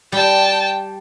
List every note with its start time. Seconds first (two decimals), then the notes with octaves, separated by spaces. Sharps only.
0.12 G3 G5 A5